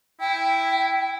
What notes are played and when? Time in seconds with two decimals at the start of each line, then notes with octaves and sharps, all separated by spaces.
0.21 E4 G5